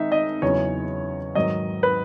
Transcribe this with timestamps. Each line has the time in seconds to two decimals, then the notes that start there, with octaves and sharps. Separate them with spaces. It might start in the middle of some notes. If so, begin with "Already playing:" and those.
Already playing: D#3 G#3 D#4 E5
0.12 D#5
0.42 E2 C#3 F#3 C#4 C#5
1.35 G#2 D#3 F#3 D#5
1.83 B4